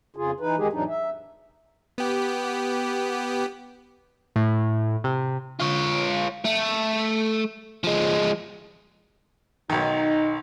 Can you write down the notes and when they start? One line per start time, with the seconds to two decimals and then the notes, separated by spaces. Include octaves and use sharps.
0.16 F2 C#3 F4 G#4
0.40 E3 D#4 B4
0.58 F2 D#3 G#3 G4 G#4
0.73 F2 A2 E3 F#3 D4 D#4
0.88 E5
1.98 B3 G4
4.36 A2
5.04 C3
5.60 F4 C#5
6.45 A3
7.84 F3 G#3
9.70 B1 D#3 D#4